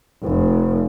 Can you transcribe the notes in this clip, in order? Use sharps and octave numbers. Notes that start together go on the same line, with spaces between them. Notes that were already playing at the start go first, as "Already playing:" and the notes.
F1